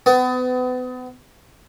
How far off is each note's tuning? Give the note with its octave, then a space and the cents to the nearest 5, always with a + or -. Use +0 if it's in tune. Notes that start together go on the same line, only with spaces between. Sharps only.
B3 +35